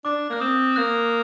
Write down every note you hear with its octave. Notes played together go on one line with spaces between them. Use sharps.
D4 D6
A#3 F#6
C4 D#6
A#3 F#6